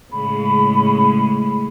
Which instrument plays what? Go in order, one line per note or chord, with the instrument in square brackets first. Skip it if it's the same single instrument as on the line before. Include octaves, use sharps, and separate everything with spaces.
[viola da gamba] A2 C#3 G#3 [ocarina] B5